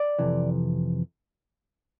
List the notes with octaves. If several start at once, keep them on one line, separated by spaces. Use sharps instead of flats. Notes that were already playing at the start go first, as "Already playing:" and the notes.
Already playing: D5
F2 C3 E3